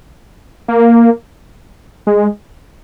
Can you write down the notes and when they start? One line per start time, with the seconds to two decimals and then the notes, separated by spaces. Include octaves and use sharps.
0.68 A#3
2.07 G#3